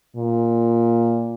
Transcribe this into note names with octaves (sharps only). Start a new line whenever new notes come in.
A#2